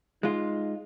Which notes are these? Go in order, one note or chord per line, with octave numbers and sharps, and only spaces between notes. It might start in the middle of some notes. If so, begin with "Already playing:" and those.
G#3 D#4 F4